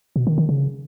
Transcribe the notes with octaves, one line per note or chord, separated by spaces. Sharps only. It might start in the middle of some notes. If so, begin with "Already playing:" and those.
B2
D#3
D#3
C#3